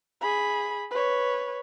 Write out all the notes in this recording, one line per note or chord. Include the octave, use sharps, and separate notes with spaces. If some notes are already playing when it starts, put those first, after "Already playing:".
G#4 B5
B4 C#5